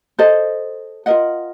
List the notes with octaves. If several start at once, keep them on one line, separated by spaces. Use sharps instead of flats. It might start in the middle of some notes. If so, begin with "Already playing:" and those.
A4 C5 D#5
F4 A#4 D#5 F#5